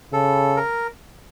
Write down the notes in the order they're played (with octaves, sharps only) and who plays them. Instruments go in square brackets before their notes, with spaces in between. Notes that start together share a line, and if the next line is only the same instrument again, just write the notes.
[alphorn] C#3 [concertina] A4
[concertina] A#4